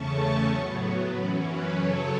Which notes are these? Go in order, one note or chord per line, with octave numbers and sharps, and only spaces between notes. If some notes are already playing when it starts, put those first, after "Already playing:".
Already playing: E2 C#3 A3 C#4 A5 C#6
A2 F#3 B3
F#2 E3 C#4 F#5 B5
B4
F#2 C#3 F#3 A4 C#5